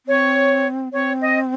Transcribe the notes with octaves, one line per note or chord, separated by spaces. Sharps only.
C4 C#5
C4 C#5
D#5